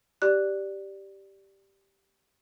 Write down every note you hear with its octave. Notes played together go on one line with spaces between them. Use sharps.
G4 D5 F#6